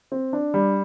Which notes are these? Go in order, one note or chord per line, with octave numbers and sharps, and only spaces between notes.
C4
D4
G3